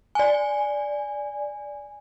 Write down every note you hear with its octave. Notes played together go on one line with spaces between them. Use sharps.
D5 G#5